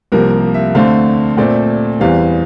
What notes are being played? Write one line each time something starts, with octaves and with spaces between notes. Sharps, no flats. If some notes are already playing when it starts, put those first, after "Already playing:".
C2 C3 F3 A#3 A#4
E5
D2 D3 A3 C4 F5
A#2 A3 C4 D5
E2 E3 G3 C4 F5